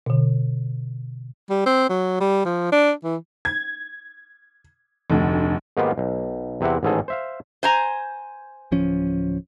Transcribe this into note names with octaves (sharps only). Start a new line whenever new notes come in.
B2 D3
G3
C4
F#3
G3
F3
D4
E3
G#6
F1 D2
G#2 D#3 A#3 B3 F4 G4
B1
E2 C3 C4 E4 F#5
A1 G#2 D#3 G#4 A4 G#5
C5 E5 F5
C5 G#5 A#5
D1 F3 C#4